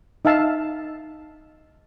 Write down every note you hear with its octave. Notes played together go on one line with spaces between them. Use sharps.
D#4 E5 F5 A5